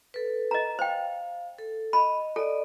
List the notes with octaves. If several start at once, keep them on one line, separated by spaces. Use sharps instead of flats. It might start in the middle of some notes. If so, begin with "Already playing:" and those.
A4 B4
D#5 A#5
C5 F5 G5
A4
D#5 B5
A4 D5 D#5